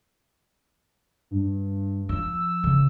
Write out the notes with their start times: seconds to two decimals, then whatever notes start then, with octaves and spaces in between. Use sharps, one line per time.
1.31 G2
2.09 F3 E6
2.64 C#3